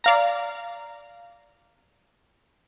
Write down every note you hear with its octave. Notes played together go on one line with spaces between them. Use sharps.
D5 F5 A#5